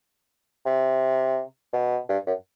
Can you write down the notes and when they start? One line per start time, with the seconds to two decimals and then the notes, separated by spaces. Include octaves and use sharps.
0.66 C3
1.73 B2
2.09 G2
2.27 F#2